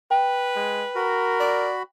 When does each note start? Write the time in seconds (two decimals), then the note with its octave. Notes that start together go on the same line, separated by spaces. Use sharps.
0.11 B4 G5
0.56 G#3
0.95 F#4 A#4 B5
1.39 D5